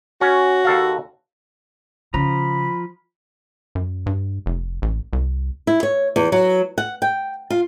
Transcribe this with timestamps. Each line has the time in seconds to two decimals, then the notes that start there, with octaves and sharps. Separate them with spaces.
0.21 C#4 F#4
0.65 D#2 A4 F5
2.14 C#3 F3 A#5 B5
3.75 F#2
4.06 G2
4.46 F1
4.82 A1
5.13 C2
5.67 E4
5.83 C#5
6.16 E2
6.32 F#3
6.78 F#5
7.02 G5
7.50 F4